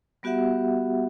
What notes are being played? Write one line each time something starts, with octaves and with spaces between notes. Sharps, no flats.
G3 B3 F#4 G4 E5 F#5